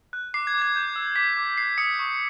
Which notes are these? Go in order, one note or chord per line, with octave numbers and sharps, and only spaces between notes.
F#6
D6 C7
G#6
D6
G#6
G6
E6
D6 B6
D6
F#6 C7
D#6 B6 C#7
C#6